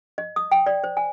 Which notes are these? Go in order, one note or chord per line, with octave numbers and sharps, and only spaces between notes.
D#5
D#6
G5
D5
C5
G#5